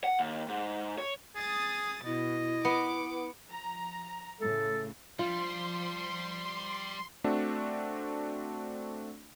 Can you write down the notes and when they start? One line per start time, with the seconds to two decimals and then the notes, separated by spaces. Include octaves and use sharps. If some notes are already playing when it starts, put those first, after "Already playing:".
0.04 F#5
0.19 D#2
0.48 G#2
0.98 C#5
1.36 G#4 D#6 A6
2.05 B2 E4 D#5
2.65 B3 D6
3.49 F3 A#5
4.41 A2 C#3 A4
5.19 F3 G3 F4 C6
7.24 A3 C4 D4 F#4